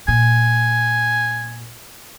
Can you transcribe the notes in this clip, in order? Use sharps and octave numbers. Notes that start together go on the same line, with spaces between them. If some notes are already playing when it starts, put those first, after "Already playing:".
A#2 G#5